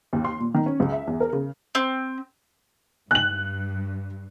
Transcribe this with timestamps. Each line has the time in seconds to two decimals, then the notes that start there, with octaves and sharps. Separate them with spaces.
0.13 D#2
0.25 C6
0.40 A#2
0.54 D#3
0.66 C#4
0.80 C#2
0.92 E5
1.07 E2
1.20 A#4
1.33 C#3
1.75 C4
3.11 G2 F#6 F#7